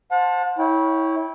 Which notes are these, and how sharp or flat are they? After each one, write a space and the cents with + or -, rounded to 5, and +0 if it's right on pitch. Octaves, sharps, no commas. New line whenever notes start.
C5 +0 F#5 -40 A5 +0
E4 -25 C#5 +0 G5 +0